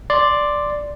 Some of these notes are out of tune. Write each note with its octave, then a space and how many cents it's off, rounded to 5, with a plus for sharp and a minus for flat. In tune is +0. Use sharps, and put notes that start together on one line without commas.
D5 +0 C6 +0